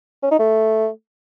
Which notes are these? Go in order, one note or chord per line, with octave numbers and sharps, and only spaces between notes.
C#4
D#4
A3